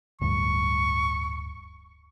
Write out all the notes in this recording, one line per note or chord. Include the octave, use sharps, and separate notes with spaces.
D1 D2 G2 C#6